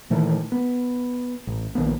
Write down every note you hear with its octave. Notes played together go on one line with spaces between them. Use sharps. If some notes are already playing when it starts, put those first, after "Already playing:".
A#2 D#3 E3 A3
B3
A1
A#1 D#3 A#3 B3